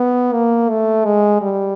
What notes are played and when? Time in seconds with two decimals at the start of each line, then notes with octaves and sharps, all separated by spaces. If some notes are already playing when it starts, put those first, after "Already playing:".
Already playing: B3
0.33 A#3
0.69 A3
1.05 G#3
1.42 G3